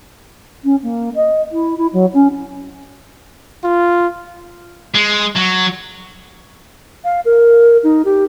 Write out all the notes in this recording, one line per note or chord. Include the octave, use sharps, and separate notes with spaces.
C#4
A#3
D#5
E4
E4
F#3
C#4
F4
G#3
F#3
F5
A#4
D#4
G4